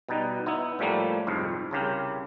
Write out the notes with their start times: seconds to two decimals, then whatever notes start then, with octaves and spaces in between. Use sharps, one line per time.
0.09 B2 G3 D#4
0.46 B3 D#4 E4
0.79 A2 F3 G3 A3 A#3
1.27 C2 F2 G#2
1.71 C2 C#3 G4 A#4